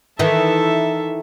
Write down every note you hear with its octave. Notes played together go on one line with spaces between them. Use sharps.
D#3 E3 A4 E5